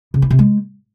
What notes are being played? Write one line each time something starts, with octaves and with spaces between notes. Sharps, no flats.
C#3
E4
C3
G#3